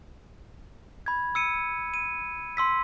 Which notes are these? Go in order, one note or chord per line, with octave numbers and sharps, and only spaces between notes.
B5 G#6
E6 C#7 D#7
D#7
C6 E6 B6